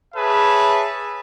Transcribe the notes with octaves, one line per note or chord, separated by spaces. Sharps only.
G#4 B4 C#5 E5 A5